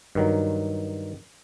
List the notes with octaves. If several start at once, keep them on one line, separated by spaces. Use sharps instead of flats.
G2 D#3 F#3